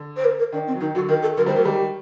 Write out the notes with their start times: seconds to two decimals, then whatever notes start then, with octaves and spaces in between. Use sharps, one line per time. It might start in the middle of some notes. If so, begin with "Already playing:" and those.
Already playing: D3
0.17 C5
0.25 A#4
0.39 A#4
0.52 D#3 D4
0.67 C4
0.74 F#3
0.81 D#3 D#4
0.95 D3 F#3 F#4
1.09 D#3 A#4
1.22 A4
1.37 D3 F#3 A#4
1.46 D#3 G3 C5
1.56 F#3 A3 A#4
1.65 D#3 G3 G4